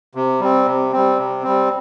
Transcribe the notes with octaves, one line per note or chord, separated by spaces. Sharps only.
C3
G3 C4
C3
G3 C4
C3
G3 C4